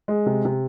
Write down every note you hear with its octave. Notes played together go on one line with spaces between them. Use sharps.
G#3
C3
C3